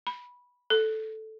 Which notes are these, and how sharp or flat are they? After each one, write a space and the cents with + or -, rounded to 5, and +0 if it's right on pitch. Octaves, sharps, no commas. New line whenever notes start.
B5 -10
A4 -5